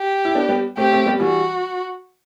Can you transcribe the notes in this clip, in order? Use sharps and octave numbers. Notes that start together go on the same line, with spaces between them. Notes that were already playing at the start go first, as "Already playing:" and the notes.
Already playing: G4
E4
B3 D4
G3 B3
A3 C4 G4
A3 C4
G3 B3
E3 G3 F#4